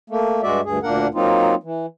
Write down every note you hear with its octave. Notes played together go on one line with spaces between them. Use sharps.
A3 A#3
G2 G#3 F#4 D5 E5
D2 G2 G#4
D2 A#2 A#3 D4 A#4 F#5
F#3 A#3 C4 D#4 F4
E3